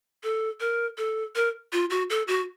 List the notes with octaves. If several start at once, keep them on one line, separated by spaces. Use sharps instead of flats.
A4
A#4
A4
A#4
F4
F#4
A4
F#4